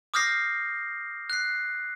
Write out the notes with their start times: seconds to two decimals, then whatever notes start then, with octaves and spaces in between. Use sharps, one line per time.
0.14 D6 D#6 F6 G6 A#6 C7
1.30 F#6 C7